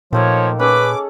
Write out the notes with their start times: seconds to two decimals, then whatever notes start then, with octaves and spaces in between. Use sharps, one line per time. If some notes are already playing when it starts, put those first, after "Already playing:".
0.13 A#2 D#3 F3 A3 A#3 C#5
0.59 C#4 G#4 A4 B4 D6